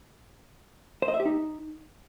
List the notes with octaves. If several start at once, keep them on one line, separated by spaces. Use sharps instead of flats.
C5
D#5
E5
G4
D#4